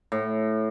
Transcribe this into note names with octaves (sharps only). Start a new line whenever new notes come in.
A2